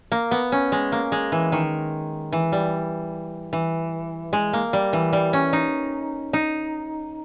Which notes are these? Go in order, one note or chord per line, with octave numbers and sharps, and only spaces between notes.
A#3
B3
C#4
G#3
A#3
G#3
E3
D#3
E3
G3
E3
G#3
A#3
G3
E3
G3
C#4
D#4
D#4